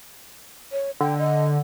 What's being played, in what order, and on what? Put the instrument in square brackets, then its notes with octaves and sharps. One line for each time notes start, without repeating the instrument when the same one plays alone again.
[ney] C#5
[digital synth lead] D3 [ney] G5
[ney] D#5